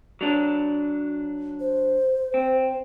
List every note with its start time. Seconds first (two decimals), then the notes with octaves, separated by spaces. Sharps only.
0.21 F#3 D4
1.60 C5
2.34 C4